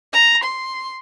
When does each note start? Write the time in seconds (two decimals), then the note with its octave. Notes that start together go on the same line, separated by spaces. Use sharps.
0.13 A#5
0.43 C6